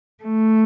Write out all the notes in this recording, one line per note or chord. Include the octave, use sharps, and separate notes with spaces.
A3